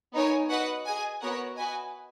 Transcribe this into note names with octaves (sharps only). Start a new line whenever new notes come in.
B3 D#4 A#4 C#5 G#5
F#4 B4 D#5 F#5
G#4 D#5 G#5
B3 F#4 A#4 C#5 F#5
F#4 B4 D#5 G#5